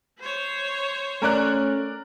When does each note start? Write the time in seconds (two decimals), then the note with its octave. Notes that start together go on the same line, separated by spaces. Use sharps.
0.19 C5 C#5
1.22 A3 C#4 A#4 D5 F#6